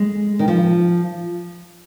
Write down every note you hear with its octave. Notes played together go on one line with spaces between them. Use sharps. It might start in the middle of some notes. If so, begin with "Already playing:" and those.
Already playing: G#3
D#3
F3